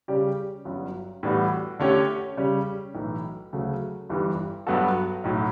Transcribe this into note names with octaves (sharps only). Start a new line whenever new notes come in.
C#3 G3 C#4 G4 D5
G1 G2 F#3 C#4
A2 E3 G3 B3 F#4
D3 A3 C#4 G4 C#5
C#3 G3 C#4
B1 A2 E3
D2 C#3 F#3 A3
G1 G2 E3 G3
G2 F#3 B3 F#4 A4
B1 A2 F#3